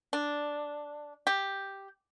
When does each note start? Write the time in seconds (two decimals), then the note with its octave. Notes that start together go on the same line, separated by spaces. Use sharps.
0.13 D4
1.27 G4